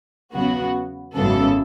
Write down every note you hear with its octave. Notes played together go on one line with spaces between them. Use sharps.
E2 C#3 F#3 B3 F#4
G#1 F#2 C#3 E3 B3 A4